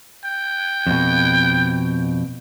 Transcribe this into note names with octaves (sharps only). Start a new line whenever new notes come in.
G5
F2 B2